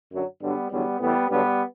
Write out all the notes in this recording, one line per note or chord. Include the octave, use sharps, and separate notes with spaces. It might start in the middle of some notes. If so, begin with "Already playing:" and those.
F#2 D3 F#3
G2 D3 F#3 G3 B3
E2 D3 F#3 G3 B3
A2 E3 G3 B3
G2 D3 F#3 G3 B3